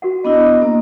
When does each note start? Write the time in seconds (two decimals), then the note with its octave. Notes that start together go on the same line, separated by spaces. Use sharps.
0.02 F#4 A#4 F#5
0.25 B3 D4 E4 D#5
0.62 A#3 A#4